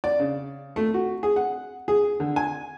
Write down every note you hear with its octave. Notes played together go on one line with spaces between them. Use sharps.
D5
C#3
A3
F#4
G#4
F#5
G#4
D3
G#5